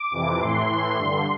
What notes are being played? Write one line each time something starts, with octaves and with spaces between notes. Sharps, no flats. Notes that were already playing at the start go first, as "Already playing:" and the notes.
Already playing: D6
F2 C3 E3
A2 E3 C6
A2 E3
G2 D3